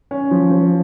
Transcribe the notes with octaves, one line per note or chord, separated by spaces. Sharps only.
C#4
F3
F3